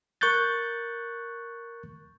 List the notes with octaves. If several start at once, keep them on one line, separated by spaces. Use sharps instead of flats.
A#4 C#6 F#6 G6 A6